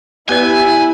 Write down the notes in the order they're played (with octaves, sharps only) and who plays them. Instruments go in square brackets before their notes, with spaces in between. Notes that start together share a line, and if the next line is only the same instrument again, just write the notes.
[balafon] B3 B4 D5 [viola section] E4 [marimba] G4 [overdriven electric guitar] G#5